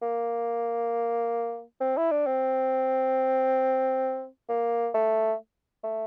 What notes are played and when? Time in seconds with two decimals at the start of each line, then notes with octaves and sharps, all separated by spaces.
0.02 A#3
1.81 C4
1.97 E4
2.11 D4
2.26 C4
4.49 A#3
4.94 A3
5.84 A3